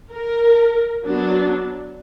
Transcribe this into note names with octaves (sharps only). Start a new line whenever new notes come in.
A#4
F#3 B3 D4